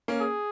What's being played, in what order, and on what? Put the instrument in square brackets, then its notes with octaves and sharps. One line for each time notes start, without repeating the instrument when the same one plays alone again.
[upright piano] A#3 C#4
[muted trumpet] G#4